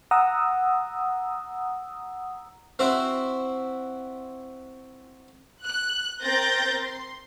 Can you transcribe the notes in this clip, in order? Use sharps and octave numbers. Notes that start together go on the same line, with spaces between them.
F#5 A#5 D#6 E6
C4 E4 F#4 C5
F#6
C4 A#4 G6 A6 A#6
C6